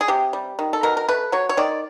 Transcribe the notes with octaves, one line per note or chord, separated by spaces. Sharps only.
G#4
C3 G4
G3
D#3
A4
B2 A#4
A#4
A3 B4
F#3 C#5
C#5
D#3 D5